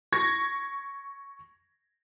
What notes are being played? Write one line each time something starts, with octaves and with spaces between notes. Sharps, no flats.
C#6 G#6 A#6